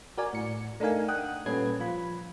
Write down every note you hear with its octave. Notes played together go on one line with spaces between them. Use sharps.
F#4 A#4 D5 G#5
A2 C#7
A3 D4 D#4 A#4 F5 G#5
F#5 G5 D#6 F#6
A#2 G3 C#4 A4 B4 G#6
F3 F4 B5